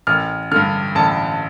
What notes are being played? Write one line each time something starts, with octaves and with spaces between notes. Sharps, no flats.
A1 F6
G2 D3 F6
A1 A5